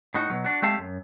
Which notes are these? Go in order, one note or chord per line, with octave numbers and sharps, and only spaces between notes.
A2 D#4 F#4
B2 F#3
D4 F#4
G#3 A3 C4 G4 F5 A5
F#2